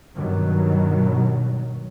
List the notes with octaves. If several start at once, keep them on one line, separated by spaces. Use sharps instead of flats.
G2 B2 D#3 F#3